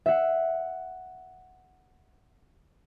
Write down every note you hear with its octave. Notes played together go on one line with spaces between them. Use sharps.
E5 F#5